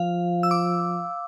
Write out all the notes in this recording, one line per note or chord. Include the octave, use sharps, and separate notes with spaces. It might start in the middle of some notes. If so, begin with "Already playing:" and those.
Already playing: F3 F5
E6
D6